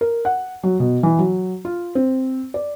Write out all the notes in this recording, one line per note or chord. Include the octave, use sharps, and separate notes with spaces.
A#4
F#5
F#3
B2
E3
F#3
F4
C4
D5